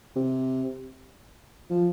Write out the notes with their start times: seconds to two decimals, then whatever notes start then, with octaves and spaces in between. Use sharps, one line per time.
0.16 C3
1.71 F3